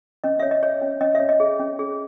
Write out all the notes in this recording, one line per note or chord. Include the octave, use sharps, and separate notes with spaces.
C#4 D#5
C#5 E5
D#5
C#5
C#4
C#4 D#5
E5
C#5
D#5
G#4
C#4
G#4